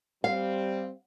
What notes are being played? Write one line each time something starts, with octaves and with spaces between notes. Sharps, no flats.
G3 C4 F5